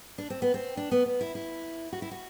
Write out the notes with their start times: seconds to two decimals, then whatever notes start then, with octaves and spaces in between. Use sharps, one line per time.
0.18 D4
0.30 C4
0.42 B3
0.54 C4
0.77 D4
0.91 B3
1.06 B3
1.21 E4
1.35 E4
1.92 F#4
2.02 E4
2.11 F#4